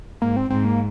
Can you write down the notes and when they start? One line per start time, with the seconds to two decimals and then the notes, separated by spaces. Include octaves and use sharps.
0.22 G#2 A#3
0.36 C4
0.50 G#2 C4
0.65 A#3